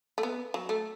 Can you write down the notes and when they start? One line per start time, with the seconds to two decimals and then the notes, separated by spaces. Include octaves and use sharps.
0.18 A3
0.23 B3
0.54 F#3
0.69 A3